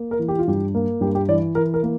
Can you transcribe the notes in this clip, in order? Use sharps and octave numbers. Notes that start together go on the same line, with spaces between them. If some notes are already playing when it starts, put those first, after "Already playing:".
Already playing: A#3
A#4
E3
G4
F4
G2 G4
A#3
G2 G4
G4
E3 D5
E3 A#4
A#4
A#3